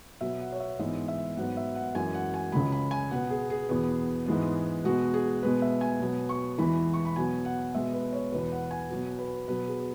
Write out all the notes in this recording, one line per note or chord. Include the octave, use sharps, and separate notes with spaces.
B2 F#3 B3 E5
F#5
C#5
E5
G#2 E3 G#3 B3 E5
E5
G#2 F#3 B3 F#5
E5
F#5
F#2 E3 G#3 G#5
F#5
G#5
C#2 C#3 G#3 B5
B5
G#5
B2 B3 F#5
G#4
G#4
E2 B2 B3
G#2 E3 G#3 B3
B2 G#3 B3 F#4
G#4
B2 G#3 B3 B4
E5
G#5
B2 F#3 B3
C#6
E2 E3 G#3 B5
C#6
B5
B2 F#3 B3 G#5
F#5
B2 G#3 B3 E5
B4
C#5
E2 B2 B3 B4
F#5
G#5
B2 F#3 B3 F#4
B4
B2 F#3 B3 B4
G#4